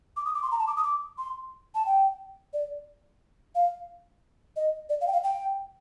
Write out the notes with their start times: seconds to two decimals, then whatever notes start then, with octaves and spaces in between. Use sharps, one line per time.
0.17 D6
0.25 D#6
0.35 D6
0.43 C6
0.52 A#5
0.59 A5
0.67 D6
0.77 D#6
0.84 D6
1.18 C6
1.75 A5
1.86 G5
2.53 D5
3.55 F5
4.56 D#5
4.89 D5
5.01 F5
5.07 G5
5.13 F5
5.24 G5